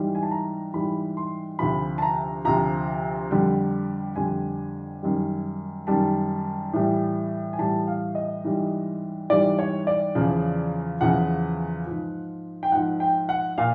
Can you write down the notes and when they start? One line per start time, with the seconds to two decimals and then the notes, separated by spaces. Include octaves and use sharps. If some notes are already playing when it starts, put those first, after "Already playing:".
Already playing: G#2 E3 G3
0.15 G#5
0.23 A5
0.31 A#5
0.74 G#2 E3 G3 B5
1.17 C6
1.59 D2 C3 F3 B5
1.98 A5
2.02 A#5
2.45 D2 C3 F3 A#5
3.31 F2 D3 G3
4.16 F2 D3 G3 G#5
5.02 F#2 D#3 G3
5.87 F#2 D#3 G3 A5
6.73 A2 E3 G3
7.53 G#5
7.58 A2 E3 G3 A5
7.88 F5
8.15 D#5
8.44 G#2 E3 G3
9.29 G#2 E3 G3 D5
9.59 C#5
9.87 D5
10.15 E2 C#3 F3
11.01 E2 C#3 F3 F#5
11.86 G#2 F3
12.63 G5
12.72 G#2 F3 F#5
13.00 G5
13.29 F#5
13.58 A#2 F5